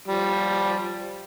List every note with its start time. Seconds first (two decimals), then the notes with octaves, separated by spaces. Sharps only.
0.08 F3 G3